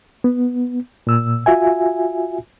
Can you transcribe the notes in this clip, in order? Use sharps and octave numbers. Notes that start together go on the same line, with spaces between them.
B3
A#2 E6
F4 F#4 E5 G#5